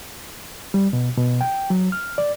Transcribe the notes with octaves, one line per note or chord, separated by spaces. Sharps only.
G3
B2
B2
G5
F#3
F6
D5